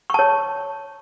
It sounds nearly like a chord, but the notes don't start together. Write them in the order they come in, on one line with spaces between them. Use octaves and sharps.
C#6 A5 C#5